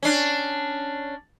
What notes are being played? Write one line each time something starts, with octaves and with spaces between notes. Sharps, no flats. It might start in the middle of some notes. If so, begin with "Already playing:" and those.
C#4 D4